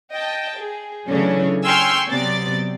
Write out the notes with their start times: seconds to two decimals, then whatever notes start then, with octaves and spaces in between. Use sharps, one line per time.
0.12 D#5 G5 A5
0.56 G#4
1.10 C#3 E3 F#3 A3 C#4 D4
1.65 G5 G#5 C6 C#6 E6 F6
2.08 C3 F#3 B3 D5 A6